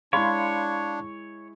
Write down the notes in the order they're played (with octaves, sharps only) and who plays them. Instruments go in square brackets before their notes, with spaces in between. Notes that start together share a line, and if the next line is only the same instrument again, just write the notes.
[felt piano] G#3 E4 [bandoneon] D4 [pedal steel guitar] C#5 [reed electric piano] F5 B5 C6